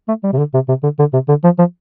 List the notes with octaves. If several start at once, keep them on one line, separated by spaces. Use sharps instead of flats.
A3
G3
C3
D3
C3
C3
D3
D3
C3
D3
F3
F3